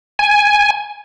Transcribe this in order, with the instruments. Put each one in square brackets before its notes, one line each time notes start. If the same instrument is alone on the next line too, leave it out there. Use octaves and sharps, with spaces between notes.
[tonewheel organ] G#5